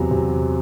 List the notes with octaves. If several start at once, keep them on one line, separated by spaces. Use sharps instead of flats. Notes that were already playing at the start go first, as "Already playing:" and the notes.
Already playing: E2 C3 F#3
C3